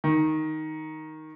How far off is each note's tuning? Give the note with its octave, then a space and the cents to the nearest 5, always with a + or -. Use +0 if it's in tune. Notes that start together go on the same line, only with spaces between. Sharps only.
D#3 +5